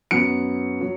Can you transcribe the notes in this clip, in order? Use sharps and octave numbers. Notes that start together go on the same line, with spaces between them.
F#2 F#3 B3 C#7
F#3